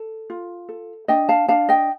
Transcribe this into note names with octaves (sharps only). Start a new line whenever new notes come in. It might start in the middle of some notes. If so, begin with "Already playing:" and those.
Already playing: A4
F4
A4
D4 D#5 G5
F5 A5
D4 F5 A5
D#5 G5